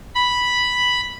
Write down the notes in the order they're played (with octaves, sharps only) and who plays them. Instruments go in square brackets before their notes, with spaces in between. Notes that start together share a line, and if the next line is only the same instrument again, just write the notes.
[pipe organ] B5